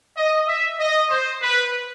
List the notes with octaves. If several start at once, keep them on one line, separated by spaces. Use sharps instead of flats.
D#5
E5
D#5
C5
B4